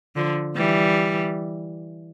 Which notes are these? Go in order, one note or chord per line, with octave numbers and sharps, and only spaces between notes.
D3 F3
E3 G3